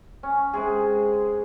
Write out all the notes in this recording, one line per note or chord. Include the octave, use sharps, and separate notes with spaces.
C#4
C3 G#3 G#4